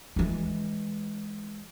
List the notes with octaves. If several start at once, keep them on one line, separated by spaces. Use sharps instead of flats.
E3 G#3